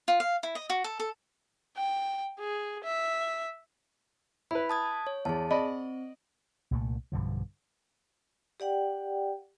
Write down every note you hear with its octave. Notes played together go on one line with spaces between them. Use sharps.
F4
F5
E4
D#5
F#4
A4
A4
G5
G#4
E5
E4 B4 B5
A5 D#6 G#6
C#5
E2 G#4 A5
C4 D5 D#5 B5
C2 A#2 A3
B1 G2 D3 F3
G4 D5 F#5 G5